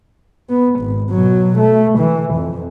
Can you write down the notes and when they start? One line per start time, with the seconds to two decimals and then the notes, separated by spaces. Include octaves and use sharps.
0.50 B3
0.80 G#1
1.11 B2 F#3
1.58 A3
1.99 E3
2.35 F2